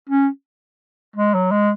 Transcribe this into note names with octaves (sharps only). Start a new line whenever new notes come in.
C#4
G#3
F#3
G#3